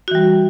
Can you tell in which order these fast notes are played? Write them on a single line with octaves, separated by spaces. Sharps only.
F#4 E3 G3